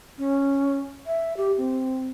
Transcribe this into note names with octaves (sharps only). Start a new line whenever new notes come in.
C#4
E5
G4
C4